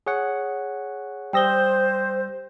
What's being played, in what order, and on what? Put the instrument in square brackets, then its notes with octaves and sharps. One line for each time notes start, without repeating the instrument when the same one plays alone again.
[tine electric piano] G#4 C#5 F#5
[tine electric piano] G3 E6 A#6 [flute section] C5 [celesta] G5 D#6 G7